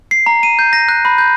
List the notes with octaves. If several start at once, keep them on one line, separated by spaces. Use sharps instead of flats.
C7
A#5
D#7
G6
A#6
F#6
B5
G6